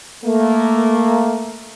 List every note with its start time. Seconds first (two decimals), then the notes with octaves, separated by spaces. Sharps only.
0.24 A3 A#3